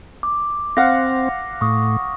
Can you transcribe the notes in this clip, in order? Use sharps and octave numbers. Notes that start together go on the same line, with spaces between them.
D6
C4 F5 F#5 A#6
A2 C#6 D#6